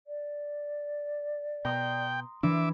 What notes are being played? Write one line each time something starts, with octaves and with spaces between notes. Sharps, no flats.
D5
B2 G5 A#5 C6 D#6
E3 D4 E5 D6